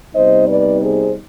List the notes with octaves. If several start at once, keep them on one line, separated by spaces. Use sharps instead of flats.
C3 G3 B3 D#4 C5 D#5
B4 D5
G#4 C5